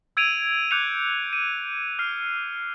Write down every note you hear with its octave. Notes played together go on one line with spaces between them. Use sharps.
E6 G#6 D7 D#7 F7
D6 F#6 G6 C#7 D#7 F7
D#7
F6 C7